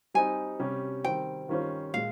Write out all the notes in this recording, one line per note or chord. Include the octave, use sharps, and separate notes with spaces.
G3 C4 D#4 G#5
C3 G3 C#4 G4
D#3 G3 C4 G5
D#3 G3 C#4 F4 C5
A#2 G#3 F5